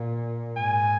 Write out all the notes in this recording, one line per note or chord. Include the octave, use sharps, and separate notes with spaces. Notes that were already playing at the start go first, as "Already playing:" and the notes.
Already playing: A#2
G#2 G#5